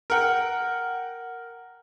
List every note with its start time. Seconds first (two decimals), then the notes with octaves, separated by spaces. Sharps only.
0.10 A#4 F#5 G5